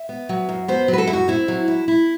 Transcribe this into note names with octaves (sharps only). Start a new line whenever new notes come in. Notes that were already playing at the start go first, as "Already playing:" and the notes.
Already playing: E5
B3
F#3
F#2
B3 C5
F#3
B4
A4
F#2 E4
F#4
C4 E4
F#3
E4
E4